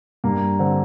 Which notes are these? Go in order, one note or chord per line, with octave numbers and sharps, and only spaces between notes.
G2 A#3
D3 C4